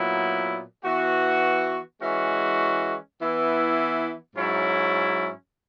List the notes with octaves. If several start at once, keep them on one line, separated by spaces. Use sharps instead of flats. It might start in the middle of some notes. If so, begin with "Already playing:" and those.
Already playing: A#2 F#3 B3 E4
E3 B3 F#4
E3 G#3 C#4 F#4
E3 B3 E4
G#2 F#3 C#4 E4